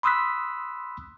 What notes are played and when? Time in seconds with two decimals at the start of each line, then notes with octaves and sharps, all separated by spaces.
0.03 B5 C6 D#6 E6 F#6 B6